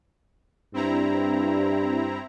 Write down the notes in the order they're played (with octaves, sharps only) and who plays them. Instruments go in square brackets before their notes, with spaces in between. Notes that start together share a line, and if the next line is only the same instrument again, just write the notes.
[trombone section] G2 [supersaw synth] C4 E4 A#5